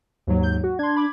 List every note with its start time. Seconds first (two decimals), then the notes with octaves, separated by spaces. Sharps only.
0.27 D#2 G#2 F#3
0.43 G6
0.64 F#4
0.79 D4 C6 G#6
0.96 B5 D6 G#6